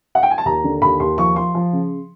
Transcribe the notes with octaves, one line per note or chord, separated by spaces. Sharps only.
F#5
G5
G#5
A5
D#2 A#5
D3
D#2 B5
D#2 C6
F3 C#6
F3 C6
F3
C#3